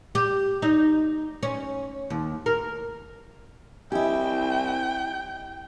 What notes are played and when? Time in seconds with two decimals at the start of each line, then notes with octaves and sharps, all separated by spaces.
0.15 G4
0.62 D#4
1.43 C#4
2.10 D#2
2.46 A#4
3.92 C2 E4 G4 D#5 E5 G5 G#5